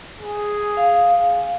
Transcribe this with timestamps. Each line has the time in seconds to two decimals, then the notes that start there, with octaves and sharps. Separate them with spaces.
0.20 G#4
0.77 F5